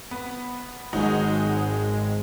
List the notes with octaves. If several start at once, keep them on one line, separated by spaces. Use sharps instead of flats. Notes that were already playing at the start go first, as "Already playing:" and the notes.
B3
G#1 F#3 G#3 D#4 F#4